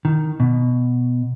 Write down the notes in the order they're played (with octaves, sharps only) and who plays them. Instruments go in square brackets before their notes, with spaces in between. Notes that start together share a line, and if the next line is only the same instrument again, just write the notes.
[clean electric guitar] D#3
B2